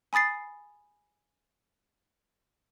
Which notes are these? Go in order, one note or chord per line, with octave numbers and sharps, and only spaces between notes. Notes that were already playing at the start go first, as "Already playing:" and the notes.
G#5 B5 D#6 A6 C7